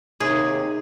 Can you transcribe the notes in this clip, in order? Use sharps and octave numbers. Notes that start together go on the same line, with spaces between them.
D#2 C3 G#4